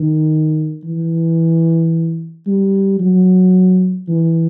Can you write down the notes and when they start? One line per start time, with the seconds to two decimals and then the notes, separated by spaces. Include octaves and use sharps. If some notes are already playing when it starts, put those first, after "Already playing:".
Already playing: D#3
0.84 E3
2.46 G3
3.00 F#3
4.08 E3